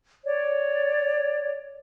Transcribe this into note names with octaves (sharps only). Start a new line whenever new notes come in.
C#5 D5